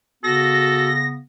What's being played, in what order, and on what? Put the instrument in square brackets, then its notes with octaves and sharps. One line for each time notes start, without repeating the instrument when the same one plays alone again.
[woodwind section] C#3 B3 [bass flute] F#4 [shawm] A4 [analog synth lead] A#6